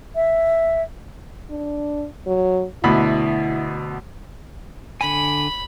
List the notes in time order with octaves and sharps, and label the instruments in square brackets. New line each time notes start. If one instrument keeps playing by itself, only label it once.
[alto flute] E5
[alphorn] D4
F#3
[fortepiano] D2 B2 B5 [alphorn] E4
[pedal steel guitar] D3 G#5 [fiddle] B5